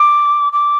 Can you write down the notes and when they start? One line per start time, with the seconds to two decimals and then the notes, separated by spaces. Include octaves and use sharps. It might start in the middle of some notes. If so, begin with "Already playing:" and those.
Already playing: D6
0.52 D6